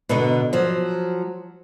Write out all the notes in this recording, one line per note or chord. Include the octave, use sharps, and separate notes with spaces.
B2 D3 B3 D#4
F3 F#3